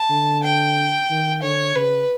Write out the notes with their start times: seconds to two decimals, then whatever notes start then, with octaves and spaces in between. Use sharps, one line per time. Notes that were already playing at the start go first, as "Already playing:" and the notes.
Already playing: A5
0.10 D3
0.43 G5
1.10 D#3
1.42 D3 C#5
1.76 C#3 B4